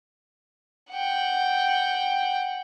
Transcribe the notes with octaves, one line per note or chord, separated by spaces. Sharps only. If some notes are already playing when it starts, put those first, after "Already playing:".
F#5 G5